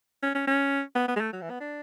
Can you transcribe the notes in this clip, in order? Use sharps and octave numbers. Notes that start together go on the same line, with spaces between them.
C#4
C#4
C#4
B3
B3
G#3
A3
F#3
E3
B3
D4